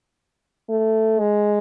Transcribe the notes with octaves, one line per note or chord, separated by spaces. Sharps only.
A3
G#3